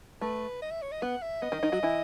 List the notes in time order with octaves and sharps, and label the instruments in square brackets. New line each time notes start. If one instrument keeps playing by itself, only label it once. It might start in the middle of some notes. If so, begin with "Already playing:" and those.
[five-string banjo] A3 [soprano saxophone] B4
[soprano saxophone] D#5
E5
C#5
D#5
[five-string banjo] B3 [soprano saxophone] F#5
[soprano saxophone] E5
[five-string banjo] B3 [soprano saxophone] D#5
[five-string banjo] D#3 D#4
D#3 D#4
F#3 F#4
E3 E4